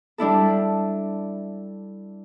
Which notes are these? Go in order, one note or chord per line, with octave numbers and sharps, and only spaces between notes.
G3 D4 E4 A4